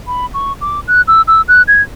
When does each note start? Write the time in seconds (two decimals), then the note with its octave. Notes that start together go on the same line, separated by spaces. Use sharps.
0.07 B5
0.34 C#6
0.61 D6
0.88 F#6
1.08 E6
1.28 E6
1.48 F#6
1.68 G#6